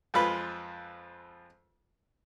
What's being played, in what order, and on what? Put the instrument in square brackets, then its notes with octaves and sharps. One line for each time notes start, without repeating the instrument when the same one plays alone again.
[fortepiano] F2 G#3 F4 B4 B5